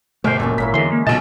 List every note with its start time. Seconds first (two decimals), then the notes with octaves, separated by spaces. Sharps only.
0.24 G1 B2 G#3 A3 G4 A#4 C5 D5
0.40 E1 F#2 A#2 C#4 A4
0.58 G#1 F#3 A#3 E4 B6
0.74 E2 D3 E3 G#3 D#4 C6
0.92 A#3
1.07 B1 A#2 C#3 G#3 F#4 D#5 A5